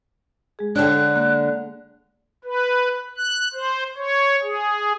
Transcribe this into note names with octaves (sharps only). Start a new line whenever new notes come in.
G#3 G#4
D3 D4 C#5 G5 F#6
A#3
B4
F#6
C5
C#5
G#4